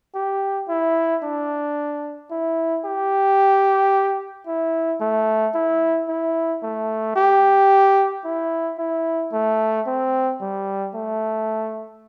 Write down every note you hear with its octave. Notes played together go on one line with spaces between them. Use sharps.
G4
E4
D4
E4
G4
E4
A3
E4
E4
A3
G4
E4
E4
A3
C4
G3
A3